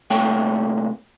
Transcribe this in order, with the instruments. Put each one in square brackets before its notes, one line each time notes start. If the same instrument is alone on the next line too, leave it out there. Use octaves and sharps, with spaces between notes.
[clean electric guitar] C2 C3 A3 A#3 C#5 G5